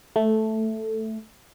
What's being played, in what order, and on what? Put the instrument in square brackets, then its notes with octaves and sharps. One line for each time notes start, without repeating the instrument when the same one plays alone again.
[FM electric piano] A3